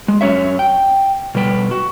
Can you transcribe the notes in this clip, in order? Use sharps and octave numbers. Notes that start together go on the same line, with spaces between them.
G#3
F#2 F#3 C#4 C#5 E5
G5
B2 G3 B4 G5
F#4